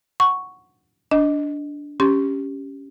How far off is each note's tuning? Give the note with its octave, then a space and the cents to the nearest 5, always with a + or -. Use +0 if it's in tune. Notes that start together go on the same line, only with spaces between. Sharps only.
F#5 +0 C#6 +0
D4 -10 D#5 +0
C#4 +0 G4 +0 C6 +0